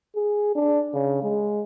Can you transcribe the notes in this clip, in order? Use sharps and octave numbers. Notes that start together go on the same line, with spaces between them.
G#4
D4
C#3
G#3